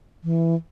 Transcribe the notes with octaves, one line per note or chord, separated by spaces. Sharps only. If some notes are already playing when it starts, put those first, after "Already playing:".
E3